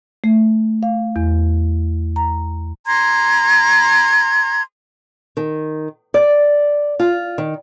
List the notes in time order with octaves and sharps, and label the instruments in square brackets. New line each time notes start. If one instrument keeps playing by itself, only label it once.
[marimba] A3
F5
E2
A#5
[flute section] A#5 C6 G#6
[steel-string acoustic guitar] D#3
D5
F4
D#3